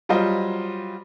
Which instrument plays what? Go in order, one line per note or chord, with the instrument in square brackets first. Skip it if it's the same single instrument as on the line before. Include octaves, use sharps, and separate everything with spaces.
[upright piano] F#3 G3 F4 C5 D#5